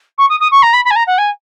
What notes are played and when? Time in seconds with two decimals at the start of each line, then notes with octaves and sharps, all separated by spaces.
0.18 C#6
0.29 D#6
0.40 D#6
0.51 C#6
0.62 A#5
0.73 B5
0.85 B5
0.91 G#5
0.96 A#5
1.07 F#5
1.18 G#5